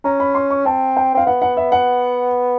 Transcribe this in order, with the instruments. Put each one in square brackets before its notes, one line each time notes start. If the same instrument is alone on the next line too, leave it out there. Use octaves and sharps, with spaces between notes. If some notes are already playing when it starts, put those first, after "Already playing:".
[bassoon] C#4 [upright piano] A#5
[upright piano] B5
C6
C#6
[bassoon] C4 [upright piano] A5
[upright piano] G5
[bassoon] C4 [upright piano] F5
[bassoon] B3 [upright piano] F#5
[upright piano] F#5
E5
F#5